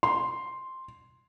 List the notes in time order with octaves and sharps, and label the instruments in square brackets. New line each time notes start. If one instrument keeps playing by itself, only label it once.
[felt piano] C6